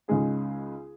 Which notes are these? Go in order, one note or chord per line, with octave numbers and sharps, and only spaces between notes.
C#2 C#3 G#3 D#4 G#4